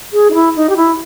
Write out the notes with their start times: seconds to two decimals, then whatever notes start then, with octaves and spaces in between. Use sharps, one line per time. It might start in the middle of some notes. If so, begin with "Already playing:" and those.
0.13 G#4
0.31 D#4
0.35 E4
0.56 D#4
0.69 G4
0.77 E4